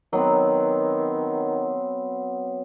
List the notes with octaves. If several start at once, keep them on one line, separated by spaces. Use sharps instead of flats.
D#3 F#3 B3 C4